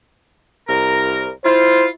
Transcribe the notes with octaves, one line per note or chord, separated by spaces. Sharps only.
C2 A#4
E4 F4 C5